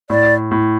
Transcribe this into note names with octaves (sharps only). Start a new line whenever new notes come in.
A2 D5
A2